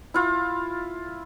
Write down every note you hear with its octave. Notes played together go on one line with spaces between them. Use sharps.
E4 F4